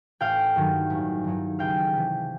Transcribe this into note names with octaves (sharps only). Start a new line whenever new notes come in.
A1 F5 G5
G2 D#3 F#3
A1
G2 D#3 F#3
C#2 F5 G5
C3 E3